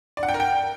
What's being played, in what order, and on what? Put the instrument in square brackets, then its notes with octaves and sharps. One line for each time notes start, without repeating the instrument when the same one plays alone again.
[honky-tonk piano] D5
F#5
G5
A#4
G5